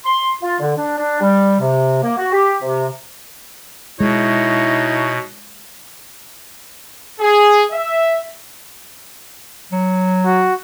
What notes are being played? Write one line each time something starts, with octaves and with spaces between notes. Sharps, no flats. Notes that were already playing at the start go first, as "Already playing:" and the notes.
C6
F4
D3
D4
D4
G3
C3
A#3
F#4
G4
C3
B2 G#3 D#4 E4 C#5
G#4
E5
F#3
F#4